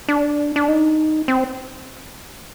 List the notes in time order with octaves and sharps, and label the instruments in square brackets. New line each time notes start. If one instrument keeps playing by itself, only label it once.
[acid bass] D4
D4
D#4
C4